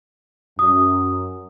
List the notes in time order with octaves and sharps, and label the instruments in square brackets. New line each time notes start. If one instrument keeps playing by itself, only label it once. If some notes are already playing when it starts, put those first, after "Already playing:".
[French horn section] F#2 [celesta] D#6